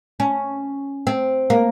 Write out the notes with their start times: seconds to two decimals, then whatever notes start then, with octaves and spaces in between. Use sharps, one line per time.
0.20 C#4
1.07 C4
1.50 A#3